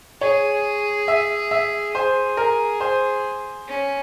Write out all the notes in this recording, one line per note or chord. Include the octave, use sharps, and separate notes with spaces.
G#4 C#5
E5
E5
G#4 C5
A#4
C5
C#4